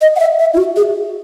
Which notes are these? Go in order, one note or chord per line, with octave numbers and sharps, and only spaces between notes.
D#5
F#5
E5
E5
E4
F#4
G#4